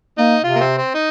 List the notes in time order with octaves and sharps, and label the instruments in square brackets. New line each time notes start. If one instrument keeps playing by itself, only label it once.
[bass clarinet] A#3 [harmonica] D#4
[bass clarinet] C3 [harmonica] F4
[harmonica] A#3
C4
C4
D#4